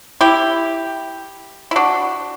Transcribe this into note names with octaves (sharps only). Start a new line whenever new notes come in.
E4 G4
E4
D4 F#4